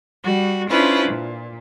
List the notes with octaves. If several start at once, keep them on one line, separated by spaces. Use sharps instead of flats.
G3 F#4
C#4 D4 E4 F4 B4 C5
A#2